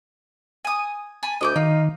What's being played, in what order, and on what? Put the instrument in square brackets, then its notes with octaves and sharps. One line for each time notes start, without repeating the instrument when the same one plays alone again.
[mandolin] G#5 D#6
G#5 A5 B5
[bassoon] D2 [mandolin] D#5 D6 G6
[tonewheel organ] D#3 [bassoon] D#4 [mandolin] F4